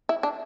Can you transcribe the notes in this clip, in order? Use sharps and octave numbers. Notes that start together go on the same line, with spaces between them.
E4
D4